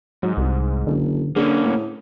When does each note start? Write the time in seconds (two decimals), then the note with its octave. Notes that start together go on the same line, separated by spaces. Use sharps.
0.23 G#2 F#3
0.37 C2
0.87 F#1 D3
1.36 D3 A#3 C4 C#4 G#4
1.65 A2